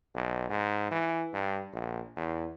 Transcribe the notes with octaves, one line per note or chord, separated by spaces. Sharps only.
B1
G#2
E3
G2
A#1
E2